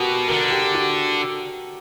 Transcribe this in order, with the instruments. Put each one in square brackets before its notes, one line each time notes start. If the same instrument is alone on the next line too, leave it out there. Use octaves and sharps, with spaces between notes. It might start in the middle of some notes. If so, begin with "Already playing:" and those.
Already playing: [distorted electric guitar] B2 [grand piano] F#4 G4 A#4 B4
[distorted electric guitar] D3 [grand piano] A#4
[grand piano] G4
F#4